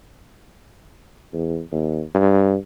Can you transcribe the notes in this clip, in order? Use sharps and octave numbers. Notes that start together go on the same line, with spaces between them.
E2
D#2
G2